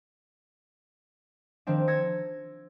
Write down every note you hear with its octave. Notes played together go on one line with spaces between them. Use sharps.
D#3 F3 C4 D4
E6 G#6 A#6 C#7